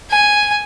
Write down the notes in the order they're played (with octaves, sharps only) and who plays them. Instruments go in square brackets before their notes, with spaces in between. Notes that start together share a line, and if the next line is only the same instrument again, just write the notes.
[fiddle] G#5